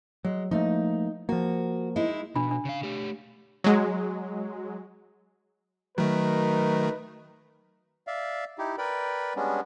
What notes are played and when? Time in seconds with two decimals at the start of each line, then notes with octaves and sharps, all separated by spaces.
0.25 F#3 G#3
0.51 F3 A3 A#3 D#4
1.29 F3 A#3 F#4
1.96 G#3 D#4 E4
2.36 B2 D4 B5
2.51 D4
2.65 C#3 F5
2.83 A3 G4
3.64 F#3 G#3
5.98 D#3 F#3 A3 D#4 A#4 B4
8.07 D5 E5 F5
8.58 D#4 E4 G4
8.78 A#4 B4 D5 G5 B5
9.36 G3 G#3 B3 C#4 D4